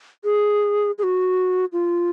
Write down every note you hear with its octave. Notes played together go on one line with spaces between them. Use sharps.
G#4
G#4
F#4
F4